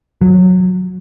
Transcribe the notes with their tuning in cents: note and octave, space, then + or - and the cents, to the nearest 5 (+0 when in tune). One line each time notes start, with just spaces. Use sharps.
F#3 -20